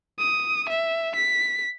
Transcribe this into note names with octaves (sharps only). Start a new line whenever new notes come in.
D#6
E5
B6